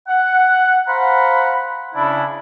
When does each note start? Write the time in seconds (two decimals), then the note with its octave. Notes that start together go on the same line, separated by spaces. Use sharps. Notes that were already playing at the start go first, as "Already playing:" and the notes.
0.08 F#5
0.88 C5 F5 F#5 A#5 B5
1.95 C#3 D4 E4